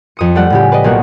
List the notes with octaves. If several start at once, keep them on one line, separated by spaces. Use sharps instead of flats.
F2 D#6 C#7
G3 A3 A4 D5 F#5
A2 C#3 G4
B4 D5 D#5
B1 A#2 A#3 C#5 F#5